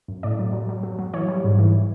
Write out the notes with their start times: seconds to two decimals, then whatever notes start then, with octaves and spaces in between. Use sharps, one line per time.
0.08 F#2
0.23 A2 D5
0.39 F#3
0.53 F#3
0.69 F#3
0.83 F#3
0.99 F#3
1.13 E3 C#5
1.28 G3
1.44 G#2
1.59 E3